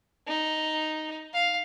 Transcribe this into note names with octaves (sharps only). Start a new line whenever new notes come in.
D#4
F5